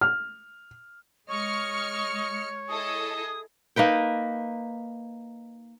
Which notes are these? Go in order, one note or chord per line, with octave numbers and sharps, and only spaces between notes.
F6
G#3 C#5 D#5 C#6 F6 C#7
E4 G#4 A4 D#5 D#6
A#3 D#4 B4 G5